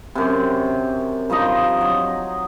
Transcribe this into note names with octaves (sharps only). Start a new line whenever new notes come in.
F#2 C3
G2 F3 D#4 D#5
F#3